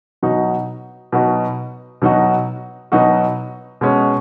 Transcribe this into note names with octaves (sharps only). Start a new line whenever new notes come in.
B2 F#3 D#4 F#4
B2 F#3 D#4 F#4
B2 F#3 D#4 F#4
B2 F#3 D#4 F#4
B2 G#3 C#4